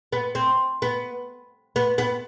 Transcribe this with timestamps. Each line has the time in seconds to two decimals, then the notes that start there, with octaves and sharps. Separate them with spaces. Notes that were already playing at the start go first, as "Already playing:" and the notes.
0.13 B3
0.35 C4
0.82 B3
1.76 B3
1.98 B3